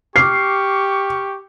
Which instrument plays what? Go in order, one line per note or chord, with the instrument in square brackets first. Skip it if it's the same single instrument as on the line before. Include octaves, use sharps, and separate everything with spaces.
[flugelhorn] G4 [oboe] C#6 [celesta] D6 F6 [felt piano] C7